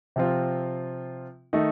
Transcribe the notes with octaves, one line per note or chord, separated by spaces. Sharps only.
C3 F3 C4 F4
D#3 A3 D#4